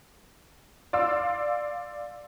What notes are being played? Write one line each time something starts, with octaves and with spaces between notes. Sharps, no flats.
D5 F5 C6 E6